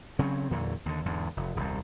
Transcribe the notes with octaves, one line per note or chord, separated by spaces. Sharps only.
C#3 F#3 C4 C#4
E2 A#2 D3 F#3
D#2 D3
E2 G#2 D3
F1
D#1 C2